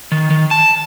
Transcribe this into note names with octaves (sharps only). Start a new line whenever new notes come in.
D#3
D#3
A5